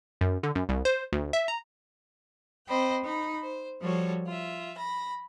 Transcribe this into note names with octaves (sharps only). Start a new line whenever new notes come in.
F#2
D3
F#2
C2
C5
D2
E5
A#5
C4 C5 D#5 G5 B5
D#4 B5
C5
F3 G3 F#4 A4 C#5
F4 E5
B5 A#6